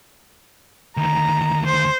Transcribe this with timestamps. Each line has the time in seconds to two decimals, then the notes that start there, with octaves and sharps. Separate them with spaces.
0.97 D2 D#3 A#5
1.66 C5